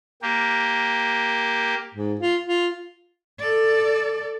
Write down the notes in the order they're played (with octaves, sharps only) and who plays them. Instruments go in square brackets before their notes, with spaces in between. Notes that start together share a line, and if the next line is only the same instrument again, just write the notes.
[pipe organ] A#3 G4
[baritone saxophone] G#2
F4
F4
[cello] A4 D5